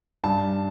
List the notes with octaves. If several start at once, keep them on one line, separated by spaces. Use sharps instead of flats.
G2 A5